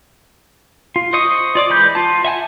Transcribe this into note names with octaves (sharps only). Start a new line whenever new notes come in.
F4
C5 D#5 C#6 D#6
F4 D5 D6
E3 G#3 B5 G6
F4 A5
E5 F#5 G#5 A5